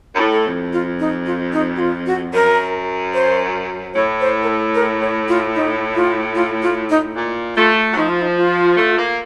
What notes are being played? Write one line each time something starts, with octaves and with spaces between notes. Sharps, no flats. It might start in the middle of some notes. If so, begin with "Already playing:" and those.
F#2
A2
A4
F2
F4
D#4
F4
D#4
F#4
F4
F#4
F#2 A#4
C5
A2 C#5
C5
A#4
A4
A#4
C#5
F4
D#4
F4
F4
F4
D#4
A#2
A3 F4
F#3
F3 D#4
F4
D#4
F4
A3
A#3